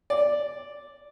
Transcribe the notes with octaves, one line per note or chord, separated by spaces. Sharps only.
D5